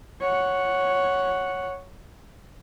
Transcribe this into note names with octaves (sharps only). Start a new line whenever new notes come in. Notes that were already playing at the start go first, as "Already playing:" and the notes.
C#5 F#5